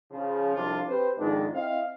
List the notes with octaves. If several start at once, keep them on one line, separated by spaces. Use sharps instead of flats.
C#3 F3
C2 F2 F3 D4 F4
C4 G4 B4 C5
F2 G#2 D#3 G#3 D4
C4 E4 D#5 F5